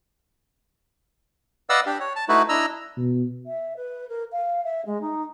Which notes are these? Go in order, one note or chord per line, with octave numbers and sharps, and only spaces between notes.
B4 D5 D#5 F5 F#5 E6
D4 G4
C#5
A5
A3 D#4 E4 F#4 B4
D4 E4 D#5 A#5 E6
B2
E5
B4
A#4
F5
E5
G#3
D#4